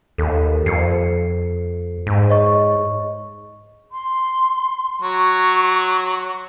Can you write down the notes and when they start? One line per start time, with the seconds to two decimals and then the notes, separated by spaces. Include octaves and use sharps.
0.18 D#2 A4
0.66 F2 C7 C#7
2.07 G#2
2.30 C#5 D#5 C#6
3.92 C6
5.02 F#3 C#6